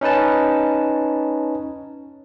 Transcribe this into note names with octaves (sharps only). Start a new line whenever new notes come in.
C#4 D#4 B4 A5